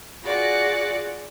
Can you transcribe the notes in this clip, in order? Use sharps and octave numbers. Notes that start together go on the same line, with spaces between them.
F4 F#4 G#4 D5 F#5